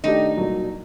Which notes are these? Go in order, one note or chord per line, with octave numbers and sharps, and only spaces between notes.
D#3 A3 D4 D#4 G4
C2 A#2 F#3